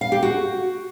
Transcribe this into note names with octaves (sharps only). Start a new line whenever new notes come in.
F5
G4
F#4